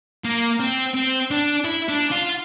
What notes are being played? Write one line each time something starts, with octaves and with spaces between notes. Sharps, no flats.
A#3
C4
C4
D4
E4
D4
F4